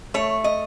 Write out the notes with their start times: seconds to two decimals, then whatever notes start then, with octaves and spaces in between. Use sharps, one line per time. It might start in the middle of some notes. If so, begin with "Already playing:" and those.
0.14 A3 C#5
0.44 D#5